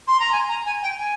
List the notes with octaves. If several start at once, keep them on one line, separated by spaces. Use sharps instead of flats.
C6
A#5
G#5
A#5
G#5
G5
G#5